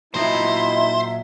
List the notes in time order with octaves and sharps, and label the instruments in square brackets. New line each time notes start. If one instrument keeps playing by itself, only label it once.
[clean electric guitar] A#2 F#3 D#5 [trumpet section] D#4 E4 [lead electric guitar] C5 [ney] E5